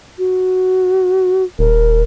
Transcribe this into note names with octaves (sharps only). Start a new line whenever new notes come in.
F#4
D#1 A#4